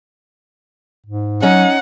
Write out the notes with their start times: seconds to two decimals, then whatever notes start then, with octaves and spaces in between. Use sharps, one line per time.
1.06 G#2
1.42 F#3 C#4 D#4 F#5